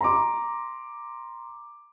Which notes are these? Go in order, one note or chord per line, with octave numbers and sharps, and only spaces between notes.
A#5 C6 D6